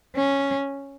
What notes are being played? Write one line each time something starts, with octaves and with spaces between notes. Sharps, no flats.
C#4